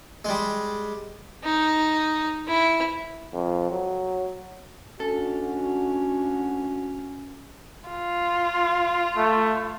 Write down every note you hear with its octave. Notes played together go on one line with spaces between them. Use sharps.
G3 G#3
D#4
E4
F2
F#3
D2 C#4 D4 F#4 A4
F4
A3